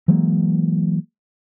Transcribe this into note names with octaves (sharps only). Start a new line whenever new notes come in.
E3 F#3 G#3 A#3